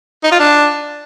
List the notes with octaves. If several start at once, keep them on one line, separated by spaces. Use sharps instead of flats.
D#4
F4
D4